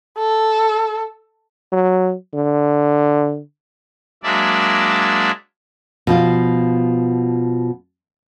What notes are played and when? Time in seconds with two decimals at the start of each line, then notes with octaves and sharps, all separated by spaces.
0.18 A4
1.72 F#3
2.34 D3
4.23 F#3 G#3 A#3 D4 D5 E5
6.07 B2 F3 F4